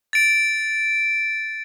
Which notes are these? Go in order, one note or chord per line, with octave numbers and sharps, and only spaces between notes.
A6 D7